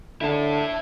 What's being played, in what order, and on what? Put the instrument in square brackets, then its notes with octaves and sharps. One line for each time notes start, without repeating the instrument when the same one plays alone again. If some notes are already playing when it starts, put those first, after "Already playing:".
[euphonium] D3 [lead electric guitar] E4 A5